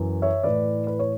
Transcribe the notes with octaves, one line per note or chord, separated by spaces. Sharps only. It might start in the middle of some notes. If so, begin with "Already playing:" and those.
Already playing: F#2 E3
C#5 E5
A2 E3 B4 D5
B4
C#5